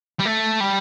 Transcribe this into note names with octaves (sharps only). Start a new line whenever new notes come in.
G3
A3
G3